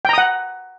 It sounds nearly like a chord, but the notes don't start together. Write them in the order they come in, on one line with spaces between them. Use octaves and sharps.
G5 A#5 D#6 F#5